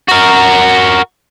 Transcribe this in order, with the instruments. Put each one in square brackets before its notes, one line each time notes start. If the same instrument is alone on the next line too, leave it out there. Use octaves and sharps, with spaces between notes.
[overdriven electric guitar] F#4 A#4